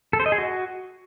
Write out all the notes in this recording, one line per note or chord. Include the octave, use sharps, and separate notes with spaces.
A4
C5
D#5
G#4
F#4